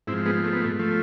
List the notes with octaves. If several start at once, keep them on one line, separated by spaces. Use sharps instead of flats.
G#2 C4 E4
F3
G#3 B3
A3
B3
A3
F3 A3